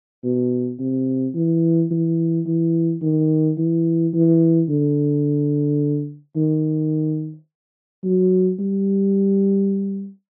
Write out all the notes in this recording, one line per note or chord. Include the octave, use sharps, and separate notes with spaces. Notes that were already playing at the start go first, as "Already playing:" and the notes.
B2
C3
E3
E3
E3
D#3
E3
E3
D3
D#3
F#3
G3